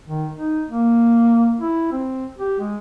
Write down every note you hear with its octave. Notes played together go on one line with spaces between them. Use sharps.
D#3
D#4
A#3
E4
C4
G4
G#3